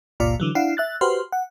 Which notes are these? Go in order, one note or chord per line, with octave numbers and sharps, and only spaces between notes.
G1 C#2 A#2 F4 D5 F5
D3 E3 F#3
D4 E4 F5 F#5 C7
E5 F#6 A6
F#4 G4 B4 C5 C6 F6
F#5